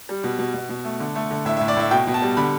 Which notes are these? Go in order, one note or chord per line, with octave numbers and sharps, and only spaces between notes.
G3
B2
B2
B2
B2
A3
D3
A3
D3
A2 E5
E5
A2
D5
A2 E5
B2 G5
B2
A5
G3
D3 B5